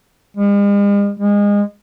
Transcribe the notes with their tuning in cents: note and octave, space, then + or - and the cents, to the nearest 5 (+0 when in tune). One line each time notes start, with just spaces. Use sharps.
G#3 -45
G#3 -25